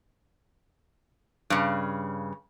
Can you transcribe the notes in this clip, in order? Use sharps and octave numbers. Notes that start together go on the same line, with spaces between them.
G2 C#3